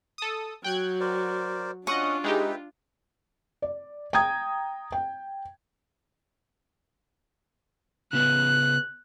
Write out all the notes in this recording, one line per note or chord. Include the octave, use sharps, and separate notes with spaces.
A4 D#6
F#3 G5 F#6 G#6
A#4 C5 D5
C#4 D4 F4 D#5 F#5 C#6 D#6
G#3 D#4 G4 B4 E5 G5
D5
G5 A#5 D#6 G#6
G5
C#3 B3 C#4 F#6